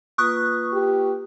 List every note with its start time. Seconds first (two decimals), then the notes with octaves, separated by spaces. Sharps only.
0.18 A#3 F4 B4 C#6 D#6 F#6
0.73 G4